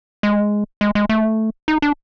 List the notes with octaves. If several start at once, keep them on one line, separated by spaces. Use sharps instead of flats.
G#3
G#3
G#3
A3
D#4
D4